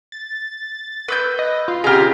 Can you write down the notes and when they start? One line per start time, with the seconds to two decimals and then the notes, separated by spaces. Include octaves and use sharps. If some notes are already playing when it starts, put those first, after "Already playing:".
0.12 A6
1.08 B4 E6 G6
1.39 D#5
1.68 F4
1.84 B2 G4 G#4 A#5 F6